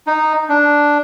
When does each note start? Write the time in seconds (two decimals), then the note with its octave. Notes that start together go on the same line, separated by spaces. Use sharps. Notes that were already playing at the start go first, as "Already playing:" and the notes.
0.07 D#4
0.49 D4